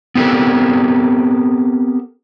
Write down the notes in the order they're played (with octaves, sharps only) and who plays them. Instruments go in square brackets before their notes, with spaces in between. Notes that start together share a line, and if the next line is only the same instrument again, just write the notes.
[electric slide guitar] B3 C4 G4 A4 A#4